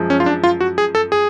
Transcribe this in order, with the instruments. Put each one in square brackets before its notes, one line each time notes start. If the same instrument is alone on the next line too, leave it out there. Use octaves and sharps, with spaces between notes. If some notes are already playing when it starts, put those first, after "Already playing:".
Already playing: [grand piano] F#2 F3 G#3
[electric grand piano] C#4
F4
D4
F4
F#4
G#4
A4
G#4